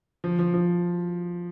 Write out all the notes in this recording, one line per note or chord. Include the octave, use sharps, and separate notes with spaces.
F3
F3
F3